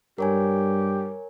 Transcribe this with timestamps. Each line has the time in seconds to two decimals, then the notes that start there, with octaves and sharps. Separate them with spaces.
0.18 G2 G4 A#4 C#5 G#5